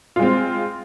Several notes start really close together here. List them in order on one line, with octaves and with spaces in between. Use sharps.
F4 G#3 C4